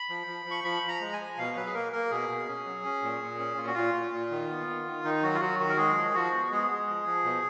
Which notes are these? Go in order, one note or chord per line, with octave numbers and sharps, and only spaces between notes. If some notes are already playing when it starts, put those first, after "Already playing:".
Already playing: B5
F3
F3
F3
C#6
F3 B5
F3
A#5
G#3
G#5
F3
B2 F5
F#3 B4
G#4
A#3 A#4
A#3 A#4
B2 G#4
B2
C#4
F#3
C#4
A#2
A#2
C#4
A#2 F4
F#4
A#2 F4
A#2
A#2
D#3
B3
D#3
D#3
D#3 D#4
F#3 F#4
F4
F#3 F#4
D#3 F#4
A#4
G#3 G#4
F3
F3 F#4
B3
G#3 G#4
G#3
F3
F3
B2